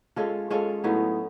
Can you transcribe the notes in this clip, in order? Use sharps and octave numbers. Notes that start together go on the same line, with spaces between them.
G#3 C#4 F4 A4
G#3 C#4 F4 A4
A2 F#3 B3 D#4